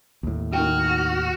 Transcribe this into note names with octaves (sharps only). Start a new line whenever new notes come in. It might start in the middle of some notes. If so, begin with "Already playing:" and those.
D#2 A2
D#3 F#4 G5 F6